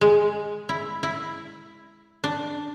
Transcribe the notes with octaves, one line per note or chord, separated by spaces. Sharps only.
G#3
E4
E4
D4